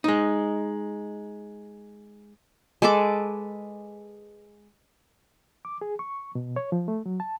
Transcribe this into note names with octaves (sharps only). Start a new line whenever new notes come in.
G#3 D#4
G#3 A4 B4 D6
D6
G#4
C#6
B2
C#5
F3
A3
F#3
A5